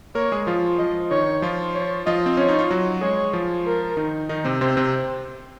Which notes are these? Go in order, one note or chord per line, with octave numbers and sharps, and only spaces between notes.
A#3 A#4 C#5
G#3 G#4
F3 F4
F3 F4 D#5
D#3 D#4 C#5
F3 F4
C#5
F3 F4 D#5
C4
C#4 C#5
D#4
F4
F#3 F#4
G#3 G#4 C#5
F3 F4
A#4
D#3 D#4
D#3 D#4
C3 C4
C3 C4 C5
C3 C4